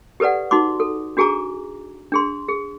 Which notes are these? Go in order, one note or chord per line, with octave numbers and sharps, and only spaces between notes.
G4 A4 B4 D5 F#5
D#4 F#4 C6 D6
A4
D4 F#4 G#4 G#5 A#5 D6
D4 G#4 C6
G#4